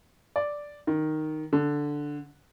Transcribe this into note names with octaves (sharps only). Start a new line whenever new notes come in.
D5
D#3
D3